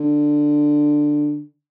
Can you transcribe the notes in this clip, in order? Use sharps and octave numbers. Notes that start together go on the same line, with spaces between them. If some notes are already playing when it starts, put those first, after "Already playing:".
Already playing: D3